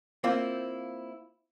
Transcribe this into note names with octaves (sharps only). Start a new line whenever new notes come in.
A#3 C4 E4 F4